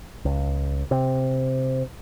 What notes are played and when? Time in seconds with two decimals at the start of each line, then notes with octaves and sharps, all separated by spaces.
0.25 C#2
0.91 C3